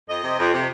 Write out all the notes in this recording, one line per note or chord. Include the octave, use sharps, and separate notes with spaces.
F2 D#5
C3
F2
C3